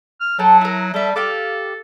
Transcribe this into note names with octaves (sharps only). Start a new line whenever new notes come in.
F6
F#3 A4 G5 A5
E4 A#4
G3 A4 E5
G4 A4 F5 D6